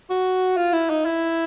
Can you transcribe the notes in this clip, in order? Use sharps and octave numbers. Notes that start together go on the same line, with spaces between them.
F#4
F4
E4
D#4
E4